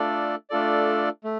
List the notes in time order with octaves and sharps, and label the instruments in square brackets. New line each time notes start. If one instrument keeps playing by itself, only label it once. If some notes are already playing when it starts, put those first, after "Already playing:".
Already playing: [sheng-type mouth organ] A3 D4 F4 A4 D5
A3 D4 F4 A4 D5
A3